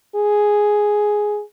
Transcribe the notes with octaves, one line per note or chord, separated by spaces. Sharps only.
G#4